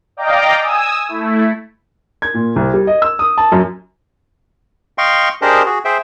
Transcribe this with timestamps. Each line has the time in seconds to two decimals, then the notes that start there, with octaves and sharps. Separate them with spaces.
0.17 D5 D#5 F5 G5 A#5 D6
0.58 G#5 D#6 E6
1.08 A3 E4
2.22 G#6
2.34 A#2
2.56 C2
2.74 G3
2.87 D#5
3.02 E6
3.19 D#6
3.38 A5
3.52 F#2
4.98 D#5 F5 G5 C6 C#6
5.42 D4 G4 G#4 A#4 C5 D#5
5.66 F#4 G#4
5.85 G#4 C5 E5 G5